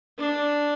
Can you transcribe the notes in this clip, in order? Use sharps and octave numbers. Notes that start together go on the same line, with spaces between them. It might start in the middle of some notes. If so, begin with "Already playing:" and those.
D4